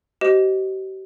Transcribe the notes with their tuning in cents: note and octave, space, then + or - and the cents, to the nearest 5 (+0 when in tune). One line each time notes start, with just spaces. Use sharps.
G4 -40 C5 -20 D#5 +0